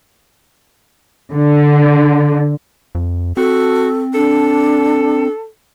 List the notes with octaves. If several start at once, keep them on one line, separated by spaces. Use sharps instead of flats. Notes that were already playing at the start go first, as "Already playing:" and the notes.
D3
F2
C4 F#4 A4
D4 A4